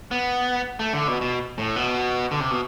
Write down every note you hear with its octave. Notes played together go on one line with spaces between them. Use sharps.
B3
A3
D3
B2
B2
A2
B2
D3
C3
B2